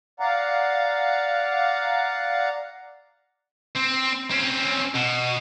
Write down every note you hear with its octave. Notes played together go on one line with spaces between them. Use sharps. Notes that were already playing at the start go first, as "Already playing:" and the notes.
D5 F5 F#5 A#5
C4
C4 C#4
B2